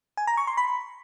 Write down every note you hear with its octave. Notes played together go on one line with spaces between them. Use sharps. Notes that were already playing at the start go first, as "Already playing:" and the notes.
G#5
A#5
C#6
C6
B5